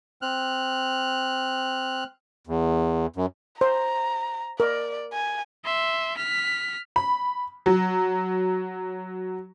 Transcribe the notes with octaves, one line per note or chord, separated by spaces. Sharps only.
C4 F6 F#6
E2
F#2
C5 A#5
A#4 D5
G#5
E5 C6
F6 B6
B5
F#3